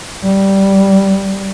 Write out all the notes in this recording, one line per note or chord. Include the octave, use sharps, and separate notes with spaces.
G3